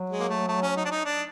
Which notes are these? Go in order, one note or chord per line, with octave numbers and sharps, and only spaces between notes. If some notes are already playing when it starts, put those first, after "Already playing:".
Already playing: F#3
G#3
A#3
A3
A3
C#4
D#4
D4
D#4
D4